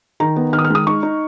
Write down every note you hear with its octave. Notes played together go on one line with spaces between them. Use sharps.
D#3 A#5
B3
D#3 F6
D#6
F6
G#3 D#6
D#4 C#6
D#4